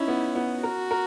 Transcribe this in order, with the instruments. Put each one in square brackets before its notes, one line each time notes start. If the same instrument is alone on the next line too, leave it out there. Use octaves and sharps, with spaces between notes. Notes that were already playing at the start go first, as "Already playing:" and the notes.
Already playing: [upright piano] C#4 D#4 [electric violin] E4
[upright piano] B3
B3
[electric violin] F#4 [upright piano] A#4
[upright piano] A#4